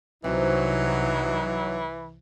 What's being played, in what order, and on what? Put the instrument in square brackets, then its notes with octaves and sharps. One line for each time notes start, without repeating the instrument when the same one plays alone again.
[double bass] C2 C3 [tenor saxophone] E3 [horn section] F#3 D#4 [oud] C4 D4